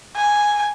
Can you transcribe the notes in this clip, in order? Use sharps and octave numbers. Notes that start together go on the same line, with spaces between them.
G#5